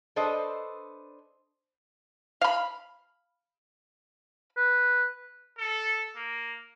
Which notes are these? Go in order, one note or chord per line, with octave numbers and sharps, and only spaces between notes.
D4 A4 B4 C5 D#5
F5 B5
B4
A4
A#3